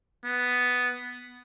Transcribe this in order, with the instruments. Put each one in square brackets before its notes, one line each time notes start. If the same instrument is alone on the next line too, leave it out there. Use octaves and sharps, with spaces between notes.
[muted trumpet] B3